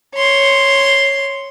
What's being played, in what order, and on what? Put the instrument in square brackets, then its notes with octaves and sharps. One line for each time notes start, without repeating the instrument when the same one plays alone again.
[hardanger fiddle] C#5 C6